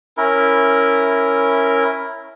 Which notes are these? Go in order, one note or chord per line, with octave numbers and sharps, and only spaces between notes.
C#4 E4 A#4